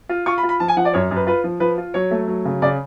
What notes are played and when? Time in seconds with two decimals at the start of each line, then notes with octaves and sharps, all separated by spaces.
0.09 F4
0.26 F4 C#6
0.38 B5
0.43 F4
0.49 B5
0.60 F3 A5
0.68 G#5
0.77 F3 F#5
0.85 D5
0.93 F#2 C#5
1.11 F#2
1.16 B4
1.27 F4 B4
1.44 F3
1.60 F3 B4
1.78 F4
1.94 F#3 C#5
2.11 A3
2.28 F#3
2.45 C#3
2.62 C#3 D5